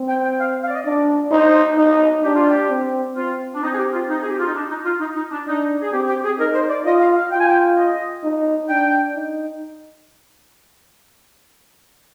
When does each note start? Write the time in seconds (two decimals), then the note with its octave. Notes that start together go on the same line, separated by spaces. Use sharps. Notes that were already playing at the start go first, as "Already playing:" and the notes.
Already playing: C4
0.09 G5
0.23 G5
0.40 F5
0.63 F5
0.68 D5
0.74 D#5
0.85 D4 D5
1.31 D#4 C5
1.78 D#4
2.23 D4 G4
2.35 F4
2.47 G4
2.69 C4
3.16 C4 F4
3.54 D4
3.62 C4 D#4
3.73 G#4
3.77 G4
3.93 F4
4.09 D#4
4.22 G#4
4.30 G4
4.38 F4
4.47 D#4
4.55 D4
4.69 D#4
4.85 F4
5.00 D#4
5.15 D#4
5.31 D4
5.47 D4 D#4
5.81 G#4
5.92 C4 G4
6.08 G4
6.24 G#4
6.39 D#4 A#4
6.53 C5
6.69 D5
6.85 F4 D#5
7.00 F5
7.16 F5
7.30 F4 G5
7.39 G#5
7.47 G5
7.77 D#5
8.24 D#4
8.68 D4 G5
9.16 D#4